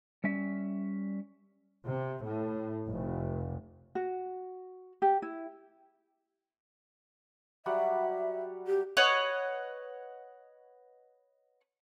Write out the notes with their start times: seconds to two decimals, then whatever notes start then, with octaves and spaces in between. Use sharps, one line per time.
0.24 G3 C#4 E5
1.85 C3
2.21 A2
2.87 F1
3.95 F#4
5.02 G4
5.22 E4
7.66 F#3 G3 E5 F#5
8.67 G4
8.97 B4 C#5 D#5 F#5